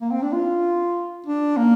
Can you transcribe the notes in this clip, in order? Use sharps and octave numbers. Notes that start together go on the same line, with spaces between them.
A#3
C4
D4
F4
D4
A#3